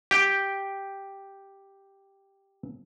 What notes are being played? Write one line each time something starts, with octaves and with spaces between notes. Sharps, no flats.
G4 G5